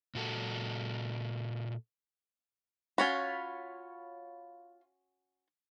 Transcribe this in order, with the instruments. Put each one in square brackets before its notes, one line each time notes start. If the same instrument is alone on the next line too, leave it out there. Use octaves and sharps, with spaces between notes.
[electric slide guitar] A#2 F#4 A4
[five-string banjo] C#4 F#4 [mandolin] F4 C#5 B5